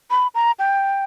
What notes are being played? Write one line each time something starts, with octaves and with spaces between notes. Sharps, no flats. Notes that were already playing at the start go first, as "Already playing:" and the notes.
B5
A#5
G5